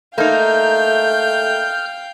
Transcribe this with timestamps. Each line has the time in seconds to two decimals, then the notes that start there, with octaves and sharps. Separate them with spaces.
0.18 A3 A#3 D#4 F5 G5 F6 G6